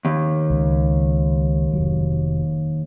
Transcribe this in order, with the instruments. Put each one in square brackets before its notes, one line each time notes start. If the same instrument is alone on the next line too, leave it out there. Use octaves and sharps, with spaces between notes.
[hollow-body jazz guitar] D#2
[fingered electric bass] C#2
F1 F#3